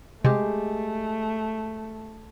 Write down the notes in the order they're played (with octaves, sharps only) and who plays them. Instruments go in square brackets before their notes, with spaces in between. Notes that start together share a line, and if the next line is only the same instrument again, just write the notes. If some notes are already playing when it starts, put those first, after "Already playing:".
[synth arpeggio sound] C3 [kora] G#3 G4 [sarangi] A3